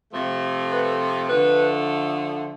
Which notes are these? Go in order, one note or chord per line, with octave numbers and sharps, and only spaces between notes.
C3 F3 A3
B4
D3 F3 A3 B4